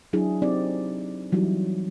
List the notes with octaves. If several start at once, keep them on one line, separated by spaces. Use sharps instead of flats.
F#3 D4 E4 G#4
C4 D#4 G4 D5
E3 F#3 G3 D#4 E4 F#4